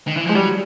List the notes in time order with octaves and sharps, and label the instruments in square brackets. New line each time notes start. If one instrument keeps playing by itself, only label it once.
[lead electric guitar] D#3
E3
[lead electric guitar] F3 [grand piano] G#3
[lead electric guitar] F#3 [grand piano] G3